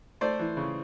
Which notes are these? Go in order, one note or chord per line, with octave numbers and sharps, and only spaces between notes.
A3 C5 D5
E3
C#3